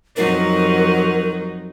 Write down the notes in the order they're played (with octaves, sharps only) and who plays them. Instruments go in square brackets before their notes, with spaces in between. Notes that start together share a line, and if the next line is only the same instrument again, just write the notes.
[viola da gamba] F2 F#3 D#4 [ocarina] A#4